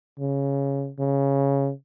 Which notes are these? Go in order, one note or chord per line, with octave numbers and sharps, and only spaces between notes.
C#3
C#3